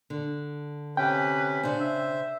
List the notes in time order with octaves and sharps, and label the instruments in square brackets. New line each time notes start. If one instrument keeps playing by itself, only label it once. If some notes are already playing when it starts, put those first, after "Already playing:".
[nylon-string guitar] D3
[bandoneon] C3 C#4 [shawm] B4 [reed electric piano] G5
[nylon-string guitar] C#3 D4 [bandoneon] C5
[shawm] E5